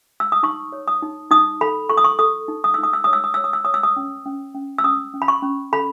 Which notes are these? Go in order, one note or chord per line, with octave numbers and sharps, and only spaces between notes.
E6
D#6
D#4 C#6
C#5
D#6
D#4
D#4 D#6
A4 B5
A4 C#6
D#6
C#6
A4 D#6
D#4
D#6
D#4 E6
D#6
E6
C#5 D#6
E6
D#6
C#5 E6
D#6
E6
C#5 D#6
E6
D#6
C#4
C#4
C#4
E6
C#4 D#6
C#4
B5
C#6
C#4
A4 B5